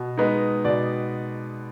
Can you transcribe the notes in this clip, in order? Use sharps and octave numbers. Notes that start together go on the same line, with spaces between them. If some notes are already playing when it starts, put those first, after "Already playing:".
Already playing: B2
G#3 B3 D#4
B2 D5